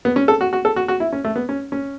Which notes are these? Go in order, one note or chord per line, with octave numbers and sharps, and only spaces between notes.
B3
C#4
A4
F#4
F#4
A4
F#4
F#4
E4
C#4
A3
B3
C#4
C#4